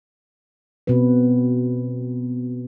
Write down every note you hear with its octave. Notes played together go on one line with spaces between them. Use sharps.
B2 B3 C4 B4